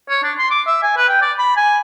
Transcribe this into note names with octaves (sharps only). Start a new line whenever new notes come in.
C#5
D4
C6
D6
E5
G#5
B4
G5
D5
B5
G#5